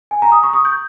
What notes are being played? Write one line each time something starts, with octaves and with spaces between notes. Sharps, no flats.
G#5
A#5
D#6
C#6
D#6
G6